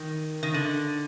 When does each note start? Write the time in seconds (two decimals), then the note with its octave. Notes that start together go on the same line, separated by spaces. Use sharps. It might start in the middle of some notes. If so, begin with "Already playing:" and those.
Already playing: D#3
0.43 D#3
0.54 D3